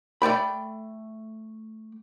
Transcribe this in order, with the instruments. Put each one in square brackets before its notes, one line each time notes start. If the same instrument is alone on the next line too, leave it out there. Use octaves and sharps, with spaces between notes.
[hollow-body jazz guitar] A3 D5 G5 B5